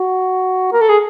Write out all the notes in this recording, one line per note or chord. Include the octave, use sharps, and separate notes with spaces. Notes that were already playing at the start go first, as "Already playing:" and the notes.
Already playing: F#4
A#4
A4
G#4